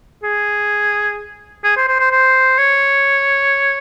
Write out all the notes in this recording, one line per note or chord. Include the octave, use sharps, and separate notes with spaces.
G#4
G#4
C5
C5
C5
C5
C#5